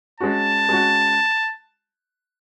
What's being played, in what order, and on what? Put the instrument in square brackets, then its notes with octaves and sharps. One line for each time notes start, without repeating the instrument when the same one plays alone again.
[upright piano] G#3 C#4 F#4 [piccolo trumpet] A5
[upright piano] G#3 C#4 F#4